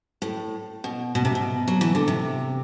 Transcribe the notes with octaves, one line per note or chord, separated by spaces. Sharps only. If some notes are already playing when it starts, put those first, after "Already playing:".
A2
B2
B2
C3
B2
F#3
E3
D3
C3